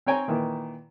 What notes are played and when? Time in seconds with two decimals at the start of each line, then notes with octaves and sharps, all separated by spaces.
0.07 C4 C#5 G5 G#5 A#5
0.28 A#2 D#3 E3